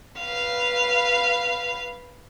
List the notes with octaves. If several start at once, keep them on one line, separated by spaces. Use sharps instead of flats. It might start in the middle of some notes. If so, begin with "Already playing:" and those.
B4 F5